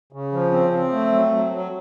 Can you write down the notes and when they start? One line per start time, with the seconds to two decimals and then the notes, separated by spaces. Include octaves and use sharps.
0.13 C#3
0.32 F3
0.52 C4
0.73 C4
0.92 A3
1.12 F#3
1.32 F#3
1.52 F#3